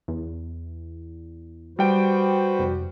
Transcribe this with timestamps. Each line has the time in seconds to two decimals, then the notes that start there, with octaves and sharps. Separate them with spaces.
0.08 E2
1.79 G3 F#4 B4 C5 G5 D7
2.59 F1